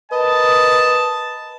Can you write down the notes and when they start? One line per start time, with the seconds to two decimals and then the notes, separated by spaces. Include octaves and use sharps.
0.12 A#4 B4 D#5 A5